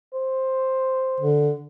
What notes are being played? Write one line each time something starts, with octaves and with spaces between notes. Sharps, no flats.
C5
D3